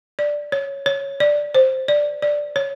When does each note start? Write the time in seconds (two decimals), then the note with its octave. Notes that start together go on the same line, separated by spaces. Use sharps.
0.19 D5
0.52 C#5
0.86 C#5
1.20 D5
1.55 C5
1.88 D5
2.22 D5
2.56 C#5